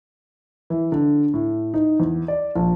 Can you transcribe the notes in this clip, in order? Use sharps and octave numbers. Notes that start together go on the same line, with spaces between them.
E3
D3
A2
D#4
E2
D5
A#1